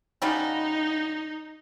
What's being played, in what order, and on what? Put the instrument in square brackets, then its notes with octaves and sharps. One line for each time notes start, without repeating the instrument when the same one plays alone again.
[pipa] C#3 G3 F#4 [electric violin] D#4